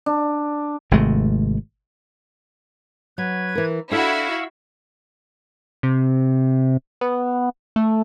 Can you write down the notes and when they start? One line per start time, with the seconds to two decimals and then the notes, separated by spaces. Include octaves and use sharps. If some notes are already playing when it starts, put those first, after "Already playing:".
0.06 D4
0.91 G#1 C3 G#3 A3
3.18 F#3 B4 G#6
3.55 E3 A#4
3.91 D4 E4 F#4 A4 F5 C#6 E6
5.83 C3
7.01 B3
7.76 A3